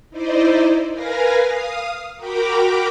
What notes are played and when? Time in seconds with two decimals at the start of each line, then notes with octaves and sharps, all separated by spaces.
0.10 D#4 E4 C5 D5 D#5
0.91 A#4 B4 F5 G#5 A#6
1.42 F5 D#6
2.16 F#4 A#4 G5 A#5 B5 D6